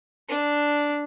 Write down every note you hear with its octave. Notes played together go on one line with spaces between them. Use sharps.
D4